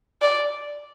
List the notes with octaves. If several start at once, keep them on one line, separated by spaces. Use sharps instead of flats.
D5